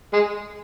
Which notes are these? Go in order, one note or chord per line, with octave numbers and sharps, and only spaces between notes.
G#3